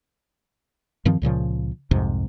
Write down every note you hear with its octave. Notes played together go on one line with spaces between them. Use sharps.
G2 D#3 F3 C4
C#2 A#2 C#3 F3
C2 F2 G#2 C3